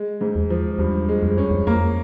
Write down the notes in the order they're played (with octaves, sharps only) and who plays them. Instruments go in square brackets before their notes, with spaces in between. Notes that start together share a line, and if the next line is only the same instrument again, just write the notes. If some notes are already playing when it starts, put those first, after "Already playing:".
Already playing: [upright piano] G#3
G#2
[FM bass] E2
[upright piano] F3
[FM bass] E2 [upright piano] G2
[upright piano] G#3
[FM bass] F2
[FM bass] F#2 [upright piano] C#4
[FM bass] F2
[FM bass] F2 [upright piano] A#3